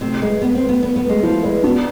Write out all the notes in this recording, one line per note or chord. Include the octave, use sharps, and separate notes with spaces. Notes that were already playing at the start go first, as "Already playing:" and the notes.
C3 A3
G#3 B4
B3 B4
C4
A3
B3
B3 B4
B3
A3
G#3
F3 E4
G#3 B4
B3 D4